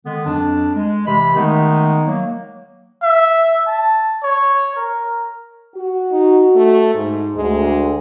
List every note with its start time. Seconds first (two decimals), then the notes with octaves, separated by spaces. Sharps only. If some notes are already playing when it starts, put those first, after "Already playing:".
0.06 D3 D#3 G#3 B3
0.26 F2 F#3 D4
0.75 G#3
1.07 C3 E3 B5
1.36 D#3 G#3 A3 B3 D#4
2.07 F#3 A#3
3.03 E5
3.67 A5
4.24 C#5
4.77 A#4
5.76 F#4
6.12 D#4
6.55 A3
6.94 G#2
7.37 D2 G#3